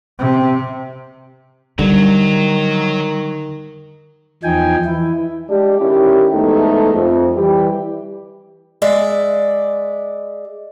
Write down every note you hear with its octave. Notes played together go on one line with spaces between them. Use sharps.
C3
D3 D#3 F#3 G3
E2 F3 D#4 G5 G#5
E3 E4
G#3 D4 G4
D#3 C#4 E4 G4
E2 G#2 A3 D#4 A4
F2
E3 G3 G4
G#3 D5 E5